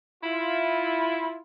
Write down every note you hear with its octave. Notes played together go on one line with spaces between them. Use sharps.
E4 F4